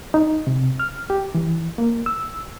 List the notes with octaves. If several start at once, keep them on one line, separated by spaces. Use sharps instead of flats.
D#4
C3
F6
G4
E3
A#3
E6